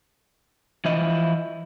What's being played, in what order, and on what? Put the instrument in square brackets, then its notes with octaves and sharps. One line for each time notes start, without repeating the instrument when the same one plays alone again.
[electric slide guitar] E3 F3 E4 D#5